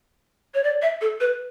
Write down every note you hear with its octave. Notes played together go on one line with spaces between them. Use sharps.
C#5
D5
E5
A4
B4